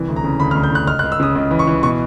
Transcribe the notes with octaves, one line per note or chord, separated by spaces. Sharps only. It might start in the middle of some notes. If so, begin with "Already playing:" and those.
Already playing: C2 E3
D2
A#5
C#3
D2 B5
F6
D2
G6
D2 F#6
C#2 F6
F#6
C#2
E6
C#3 D#6
C#2
E3
C#6
E3
B2 C#6